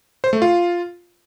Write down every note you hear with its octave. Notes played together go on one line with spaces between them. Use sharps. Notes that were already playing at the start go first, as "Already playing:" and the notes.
C5
A3
F4